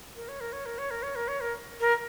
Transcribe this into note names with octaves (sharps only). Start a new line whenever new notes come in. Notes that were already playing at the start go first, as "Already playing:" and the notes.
A#4
C#5
A#4
C#5
A#4
C#5
A#4
C#5
A#4
C#5
A#4
A#4